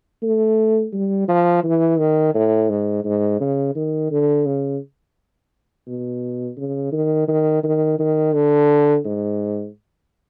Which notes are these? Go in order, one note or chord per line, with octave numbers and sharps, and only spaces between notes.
A3
G3
F3
E3
D#3
A2
G#2
G#2
C#3
D#3
D3
C#3
B2
C#3
D#3
D#3
D#3
D#3
D3
G#2